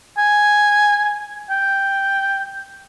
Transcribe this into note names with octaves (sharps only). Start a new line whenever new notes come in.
G#5
G5